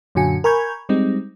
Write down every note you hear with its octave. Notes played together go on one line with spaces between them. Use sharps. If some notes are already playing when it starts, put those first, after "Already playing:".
F#2 A#2 D3 F#4 G#5 C#7
A#4 G#5 B5 C#6 G6 G#6
G3 G#3 C4 D#4